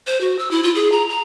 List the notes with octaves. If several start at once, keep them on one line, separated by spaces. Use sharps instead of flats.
C5
F#4
E6
E4
F4
G#4
A#5
A#5